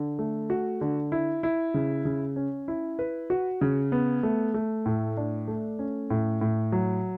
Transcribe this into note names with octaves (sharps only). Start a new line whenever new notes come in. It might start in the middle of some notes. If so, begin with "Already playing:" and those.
Already playing: D3
A3
F#4
D3
E4
E4
C#3
C#3
C#4
E4
B4
F#4
C#3
B3
A3
A3
A2
D4
A3
C#4
A2
A2
F#3